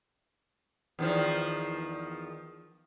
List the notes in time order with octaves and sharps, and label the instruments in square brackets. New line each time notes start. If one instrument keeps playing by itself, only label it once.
[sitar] E2 D#3 F3